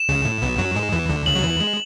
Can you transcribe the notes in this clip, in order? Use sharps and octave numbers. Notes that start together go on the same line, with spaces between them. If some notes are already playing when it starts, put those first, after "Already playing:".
Already playing: E7
C#2 C#3
A2
B1 B2
F#2 F#3
G#2 G#3
E2 E3
D2 D3
C#2 C#3 F#7
F#3
E2 E3
G#3